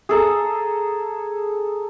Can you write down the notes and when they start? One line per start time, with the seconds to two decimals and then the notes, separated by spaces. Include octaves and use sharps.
0.09 G#4 A4 A#5